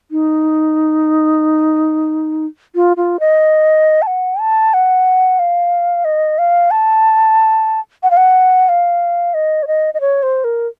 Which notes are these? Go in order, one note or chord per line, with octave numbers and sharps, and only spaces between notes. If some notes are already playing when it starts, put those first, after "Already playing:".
D#4
F4
F4
D#5
A5
F#5
A5
F#5
F5
D#5
F5
A5
F#5
F5
F#5
F5
D#5
C#5
D#5
D#5
C#5
C5
A#4